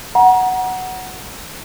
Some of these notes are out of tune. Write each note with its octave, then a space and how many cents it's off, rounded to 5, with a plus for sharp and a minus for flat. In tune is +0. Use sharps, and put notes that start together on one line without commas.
F#5 +0 A#5 +30